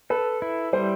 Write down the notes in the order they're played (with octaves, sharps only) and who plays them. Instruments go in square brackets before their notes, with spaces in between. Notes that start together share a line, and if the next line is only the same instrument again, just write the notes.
[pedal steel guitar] A4 [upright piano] B4
[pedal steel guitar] E4
[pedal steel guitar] G3 [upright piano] C5